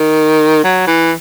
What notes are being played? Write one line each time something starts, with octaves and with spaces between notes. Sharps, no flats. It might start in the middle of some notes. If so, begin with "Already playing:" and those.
Already playing: D#3
F#3
E3